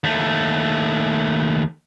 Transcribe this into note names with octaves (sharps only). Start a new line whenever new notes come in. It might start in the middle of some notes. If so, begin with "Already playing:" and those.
D#2 A3